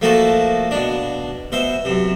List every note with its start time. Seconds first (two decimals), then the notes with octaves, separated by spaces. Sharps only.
0.02 F3 A3 A#3 F#4 A4
0.71 B2 D4
1.52 B2 C5 E5
1.85 F#2 C3